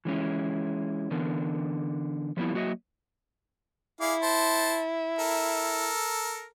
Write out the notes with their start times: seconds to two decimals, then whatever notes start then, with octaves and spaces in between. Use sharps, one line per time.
0.05 E3 G#3 C#4 E4
1.11 D3 E3 B3 A#4
2.37 F3 G3 A#3 B3 E4
2.54 F#3 A#3 F#4 G4 D#5 E5
4.01 E4 G#4 D5 F5
4.22 C5 A5
5.19 A4 A#4